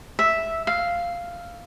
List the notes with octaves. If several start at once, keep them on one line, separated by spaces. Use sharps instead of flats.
E5
F5